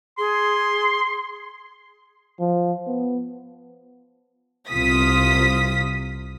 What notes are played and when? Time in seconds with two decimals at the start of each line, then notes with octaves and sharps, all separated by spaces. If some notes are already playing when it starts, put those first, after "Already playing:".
0.18 G#4 C6
2.40 F3
2.87 B3
4.69 C2 C3 F4 D#6 B6